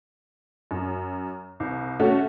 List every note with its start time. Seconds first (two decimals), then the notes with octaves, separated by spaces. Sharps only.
0.71 F#2
1.60 C2
2.00 A3 C#4 F#4